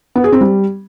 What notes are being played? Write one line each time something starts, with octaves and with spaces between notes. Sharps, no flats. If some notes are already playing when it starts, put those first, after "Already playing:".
B3
G#4
C4
G3